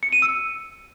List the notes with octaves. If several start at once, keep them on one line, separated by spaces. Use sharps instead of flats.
C#7
D#7
E6